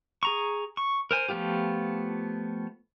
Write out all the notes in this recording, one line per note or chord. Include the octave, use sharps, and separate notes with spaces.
G#4 A#5 C#6
C#6
A#4 C5 G#5
F3 A3 B3 F4 G4